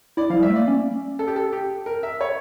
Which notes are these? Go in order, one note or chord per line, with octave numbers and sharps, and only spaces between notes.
E4 D5
F3 F5
G3 E5
A3
A#3 D5
C#4
A4
G4
A4
G4
A#4
E5
C#5